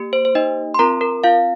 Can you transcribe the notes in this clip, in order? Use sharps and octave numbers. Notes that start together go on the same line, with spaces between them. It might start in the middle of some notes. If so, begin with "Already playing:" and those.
Already playing: A#3 G4
C5
C5
D#4 D#5
C6
C4 F4 A#4 A#5
A#4
F4 F5